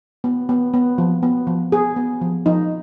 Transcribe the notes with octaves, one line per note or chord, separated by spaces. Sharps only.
B3
B3
B3
F3
B3
F3
B3 G#4
B3
F3
F3 D#4